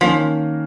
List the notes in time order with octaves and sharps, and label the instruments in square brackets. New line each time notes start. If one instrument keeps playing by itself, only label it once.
[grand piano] D#3 A#3 C#4 [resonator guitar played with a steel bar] F3